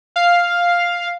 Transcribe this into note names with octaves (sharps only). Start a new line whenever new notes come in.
F5